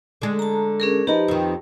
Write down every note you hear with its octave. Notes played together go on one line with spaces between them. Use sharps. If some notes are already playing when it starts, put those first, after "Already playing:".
D3 G#3
A5 A#5
C#4 G#4 A#4
F3 D#4 G4 B4
F2 D#3